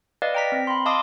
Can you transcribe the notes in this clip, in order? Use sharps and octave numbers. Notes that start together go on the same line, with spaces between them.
B4 D5 D#5 F5
G5 A#5 B6
C4
B5 C6
D#5 F5 A5 C6 D6 D#6